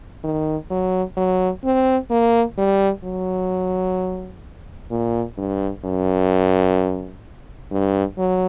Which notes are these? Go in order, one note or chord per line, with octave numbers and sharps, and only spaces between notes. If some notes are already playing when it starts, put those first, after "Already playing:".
D#3
F#3
F#3
C4
A#3
G3
F#3
A#2
G2
F#2
G2
F#3